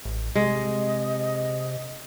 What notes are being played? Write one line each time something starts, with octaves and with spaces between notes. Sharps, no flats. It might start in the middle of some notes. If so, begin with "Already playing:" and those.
A1
C3 G#3 D#5